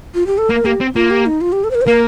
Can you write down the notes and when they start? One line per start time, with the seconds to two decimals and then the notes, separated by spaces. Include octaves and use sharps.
0.15 F4
0.27 G4
0.38 A4
0.50 A#3 A#4
0.65 A#3 G4
0.81 C4
0.95 A#3 F4
1.10 G4
1.26 D#4
1.41 F4
1.52 G4
1.64 A4
1.71 C5
1.75 A#4
1.81 C5
1.86 A#3 A#4